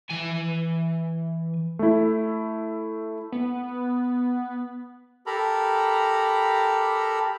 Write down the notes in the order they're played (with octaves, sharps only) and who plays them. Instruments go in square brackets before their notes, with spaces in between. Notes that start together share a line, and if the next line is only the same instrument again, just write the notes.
[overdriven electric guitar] E3 G#5
[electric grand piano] A3 E4
[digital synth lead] B3
[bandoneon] G4 A4 A#4 A#5 B5